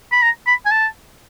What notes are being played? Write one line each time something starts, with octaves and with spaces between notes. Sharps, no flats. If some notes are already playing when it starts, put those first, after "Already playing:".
B5
A#5
B5
G#5
A5